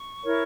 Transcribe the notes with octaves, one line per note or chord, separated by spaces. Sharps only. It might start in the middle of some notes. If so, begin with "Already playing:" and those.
Already playing: C#6
E4 A#4 C#5